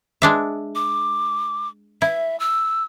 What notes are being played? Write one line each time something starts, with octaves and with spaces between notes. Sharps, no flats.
G#3 D4 E5
D6
E4 E5
E6